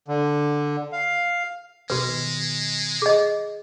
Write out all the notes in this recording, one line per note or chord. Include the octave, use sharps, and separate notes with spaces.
D3
F5
B2 D#3 G#3 F#4 B4
G#4 D#5